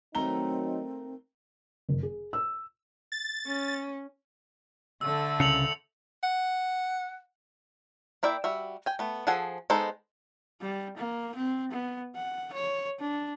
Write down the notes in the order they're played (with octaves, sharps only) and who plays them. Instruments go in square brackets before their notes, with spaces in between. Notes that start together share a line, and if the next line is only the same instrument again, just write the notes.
[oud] D#3 A3 A#3 [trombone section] F#3 D#4 [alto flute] C4 [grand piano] A#5 G7
[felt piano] F#1
G#4
E6
[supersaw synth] A6
[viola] C#4
[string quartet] D3 A3 [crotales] E6
[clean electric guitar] C2 C#3 [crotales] C#7 F7 F#7
[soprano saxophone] F#5
[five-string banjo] A#3 E4 D5 E5 G5
G3 F#4 E5
G5 G#5
A3 B3
F3 G#4 A4 F#5 G#5
G#3 B3 D#4 A4 C5
[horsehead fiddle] G3
A#3
C4
B3
F#5
C#5
D4